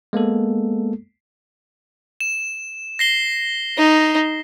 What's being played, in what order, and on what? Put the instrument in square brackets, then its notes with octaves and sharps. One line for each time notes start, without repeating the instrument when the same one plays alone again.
[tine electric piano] G#3 A#3 B3 A4
[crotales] E7
A#6 C7 G7
[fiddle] D#4